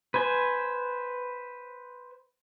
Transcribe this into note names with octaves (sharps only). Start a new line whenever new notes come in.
B4 C5 G#5